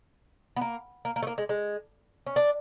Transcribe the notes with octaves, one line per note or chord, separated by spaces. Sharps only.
B3
A#3
A#3
A#3
A3
A#3
G#3
G#3
C#4
D4